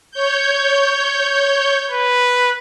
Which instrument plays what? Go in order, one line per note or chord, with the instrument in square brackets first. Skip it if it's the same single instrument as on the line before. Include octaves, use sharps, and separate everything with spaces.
[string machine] C#5 G6
[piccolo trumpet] B4